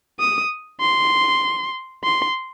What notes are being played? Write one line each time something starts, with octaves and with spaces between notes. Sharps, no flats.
D#6
C6
C6